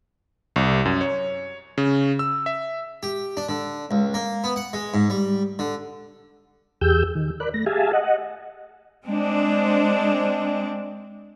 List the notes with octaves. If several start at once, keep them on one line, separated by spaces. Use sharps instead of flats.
C2
F#2
C#5
C#3
E6
E5
G4
D4
D3
C#2
A#3
B3
F#5
G#3
G#2
G3
D3
E2 G4 G#4 E6 G6
D#3
A#4 D5 B5 F#6
A3 A#6
G4 G#4 E5 F5 G#5 A5
D#5 F#5
G#3 C4 D4